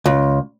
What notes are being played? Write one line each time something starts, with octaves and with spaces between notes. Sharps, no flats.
C#2